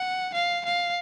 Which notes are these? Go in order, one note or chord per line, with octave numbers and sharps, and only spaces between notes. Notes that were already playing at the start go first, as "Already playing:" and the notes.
Already playing: F#5
F5
F5